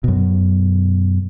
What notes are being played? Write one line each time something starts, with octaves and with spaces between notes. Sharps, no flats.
F#2 B2